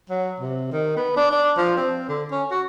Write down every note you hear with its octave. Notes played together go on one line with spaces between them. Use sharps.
F#3
C3
D#3
B3
D4
D4
F3
C4
D3
C#4
F#4